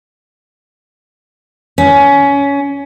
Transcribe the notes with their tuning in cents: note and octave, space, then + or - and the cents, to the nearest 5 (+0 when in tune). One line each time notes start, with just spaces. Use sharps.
C#4 +20